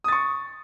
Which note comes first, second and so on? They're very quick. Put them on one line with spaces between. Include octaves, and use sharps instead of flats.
D#6 A6 C#6